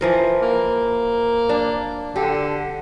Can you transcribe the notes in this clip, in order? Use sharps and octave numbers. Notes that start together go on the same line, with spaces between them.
E3 F3 A#4
A#3
D4
D3 G4